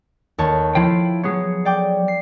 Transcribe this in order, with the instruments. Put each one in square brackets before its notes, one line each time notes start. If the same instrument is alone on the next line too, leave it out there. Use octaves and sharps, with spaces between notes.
[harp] D#2 C#5 A5
[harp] F3 [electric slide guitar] E4 F4 G5
[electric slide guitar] F#3 G#4 C#5 [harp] B3
[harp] D5 G5 D6
C7